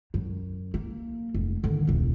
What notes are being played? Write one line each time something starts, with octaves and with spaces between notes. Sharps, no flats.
F#2
A#3
F1
D3 D#3
E1 C#2